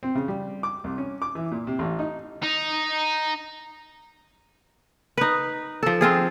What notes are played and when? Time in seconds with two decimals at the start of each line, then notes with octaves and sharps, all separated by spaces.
0.03 C4
0.15 C#3
0.28 G3
0.63 D6
0.84 C2
0.98 C#4
1.22 D6
1.35 E3
1.52 A#2
1.67 C3
1.79 A1
1.99 D#4
2.43 D#4
5.18 D#4 B4
5.83 F3 A4
6.01 C4 F4 G#4